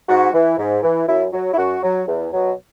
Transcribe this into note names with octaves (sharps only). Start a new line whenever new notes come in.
G#2 F#4
E3
G#2
E3
F#2 E4
F#3
E4
F#2 F#4
F#3
E2
B2 F#3